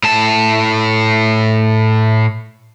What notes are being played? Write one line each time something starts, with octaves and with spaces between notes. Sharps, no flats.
A2 A5